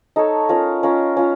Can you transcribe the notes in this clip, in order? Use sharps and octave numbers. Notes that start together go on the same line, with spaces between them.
D#4 A4 C#5
C#4 F4 A#4
C#4 F4 A#4
C#4 F4